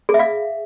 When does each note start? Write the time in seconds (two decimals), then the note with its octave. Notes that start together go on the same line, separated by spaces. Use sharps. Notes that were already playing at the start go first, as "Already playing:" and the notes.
0.09 G#4
0.14 E5
0.19 F5